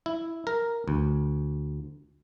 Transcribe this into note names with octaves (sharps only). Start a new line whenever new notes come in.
E4
A#4
D2